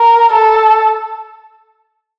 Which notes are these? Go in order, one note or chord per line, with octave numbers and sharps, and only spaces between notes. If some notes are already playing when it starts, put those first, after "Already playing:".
Already playing: A#4
A4